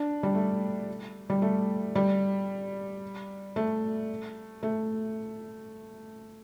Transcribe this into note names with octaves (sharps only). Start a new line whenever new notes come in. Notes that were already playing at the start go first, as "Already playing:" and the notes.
Already playing: D4
G3
A3
G3
A3
G3
A3
A3